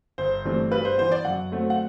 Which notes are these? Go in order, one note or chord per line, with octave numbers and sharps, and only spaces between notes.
G1 C5
G2 E3 A3 C4
G2 B4
C5
E3 B3 C5
D5
F#2 F#5
D3 F#3 A3 C4
F#5